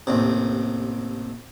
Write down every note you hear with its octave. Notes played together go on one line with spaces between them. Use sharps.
A1 D#2 C3